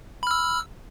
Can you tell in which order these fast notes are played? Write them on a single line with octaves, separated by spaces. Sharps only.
B5 F6 E6